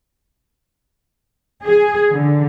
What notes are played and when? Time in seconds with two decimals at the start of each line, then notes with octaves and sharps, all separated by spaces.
1.64 G#4
2.14 D3